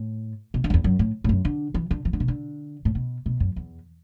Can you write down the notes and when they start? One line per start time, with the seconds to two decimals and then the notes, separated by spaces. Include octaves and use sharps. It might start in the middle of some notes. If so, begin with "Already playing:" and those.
Already playing: A2
0.54 B2
0.64 D3
0.70 F#2
0.74 E2
0.84 F#2
0.99 A2
1.24 A2
1.29 F#2
1.45 D3
1.74 E3
1.91 D3
2.05 E3
2.13 D3
2.20 B2
2.28 D3
2.85 A2
2.95 B2
3.26 B2
3.40 F#2
3.56 E2